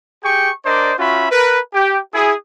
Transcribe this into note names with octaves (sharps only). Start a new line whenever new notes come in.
G4 G#4 G5 C#6
D4 A#4 C5 D5 D#5
C#4 F4 F#4 E5 B5
A#4 B4
G4 G5
E4 F#4 G#4